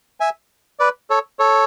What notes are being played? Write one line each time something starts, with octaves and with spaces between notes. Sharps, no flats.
E5 G#5
B4 D5
A4 C#5
A4 C#5